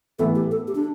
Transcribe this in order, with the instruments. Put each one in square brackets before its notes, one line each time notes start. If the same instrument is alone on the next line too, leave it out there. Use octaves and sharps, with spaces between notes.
[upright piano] A2 E3 B3 E4 [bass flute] A4
[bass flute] G4
A4
G4
D4